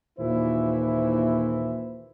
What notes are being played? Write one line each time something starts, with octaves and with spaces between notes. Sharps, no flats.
D#2 A#2 E3 E4 C5